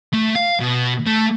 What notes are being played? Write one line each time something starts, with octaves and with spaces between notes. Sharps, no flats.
A3
F5
B2
A3